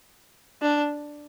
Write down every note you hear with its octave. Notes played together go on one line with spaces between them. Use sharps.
D4